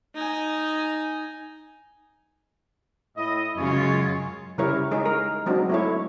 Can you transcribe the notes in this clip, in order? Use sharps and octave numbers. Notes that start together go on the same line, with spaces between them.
D#4 G#5
A2 E4 D#5
F#2 C#3 G#3 F4 G#4 C#5
C#3 G3 E4 A#4 C#5
G#3 D#4 G#4 C#5
A#4
F#3 G#3 C4 D4 D#4 F#4
A3 E4 C#5